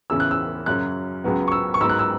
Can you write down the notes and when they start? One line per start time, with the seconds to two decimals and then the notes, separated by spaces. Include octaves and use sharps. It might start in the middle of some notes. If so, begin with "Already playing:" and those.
0.10 E2 C#3 E3 C#4 E6
0.20 F#6
0.31 E6
0.66 F#2 C#3 F#3 C#4 F#6
1.24 C#2 C#3 F#3 B3
1.48 C#6
1.52 E6
1.74 C#6
1.80 G#2 F#3 B3 E6
1.89 F#6
1.99 E6